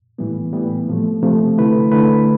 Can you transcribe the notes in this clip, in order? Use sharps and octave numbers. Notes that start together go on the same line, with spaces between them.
A2 E3 G3 B3
A2 E3 G3 B3
C3 F3 A3
C3 F3 A3
D3 A3 E4 B4
D3 A3 E4 B4